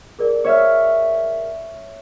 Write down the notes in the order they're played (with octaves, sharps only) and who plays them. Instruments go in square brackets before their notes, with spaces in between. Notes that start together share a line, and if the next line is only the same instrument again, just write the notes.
[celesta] G#4 A#4 D5
[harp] C#5 E5 F6